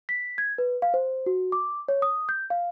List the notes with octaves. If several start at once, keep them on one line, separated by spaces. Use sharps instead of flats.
B6
G#6
B4
F5
C5
F#4
D6
C#5
D#6
G6
F5